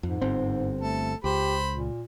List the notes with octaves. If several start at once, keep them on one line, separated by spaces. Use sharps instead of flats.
F2 G#2
G1 C4
A3 A4
C#2 G4 C5 B5
A#2